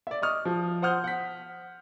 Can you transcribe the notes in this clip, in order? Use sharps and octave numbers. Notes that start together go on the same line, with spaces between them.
D5 E5
D#5 C#6 D#6 F6
F3
C5 F#5 D#6 F6 G6
F#5 B6